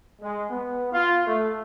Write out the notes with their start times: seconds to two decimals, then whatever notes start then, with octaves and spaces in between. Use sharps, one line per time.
0.21 G#3
0.50 B3
0.92 F4
1.26 A3